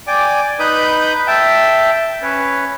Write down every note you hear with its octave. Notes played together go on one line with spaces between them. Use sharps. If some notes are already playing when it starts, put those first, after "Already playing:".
D5 G5 G#5 D6
D#4 B4 B5 D#6 G6
E5 G5 A5
C#4 B4 C#5